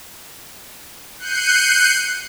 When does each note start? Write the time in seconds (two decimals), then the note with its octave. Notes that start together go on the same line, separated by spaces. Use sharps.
1.18 F#6 G6 C7 C#7 D#7